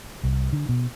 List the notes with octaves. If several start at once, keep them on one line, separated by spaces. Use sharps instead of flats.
C2
D3
B2